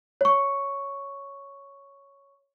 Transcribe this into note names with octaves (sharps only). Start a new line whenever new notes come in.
C#5 C#6